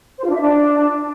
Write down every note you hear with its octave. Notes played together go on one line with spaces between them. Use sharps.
C5
F4
D4
E5
D4